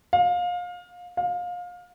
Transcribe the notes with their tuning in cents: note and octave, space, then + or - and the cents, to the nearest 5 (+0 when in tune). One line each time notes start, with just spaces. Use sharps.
F5 +25
F5 +25